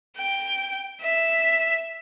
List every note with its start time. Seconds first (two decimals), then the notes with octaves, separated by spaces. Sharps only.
0.16 G5
1.02 E5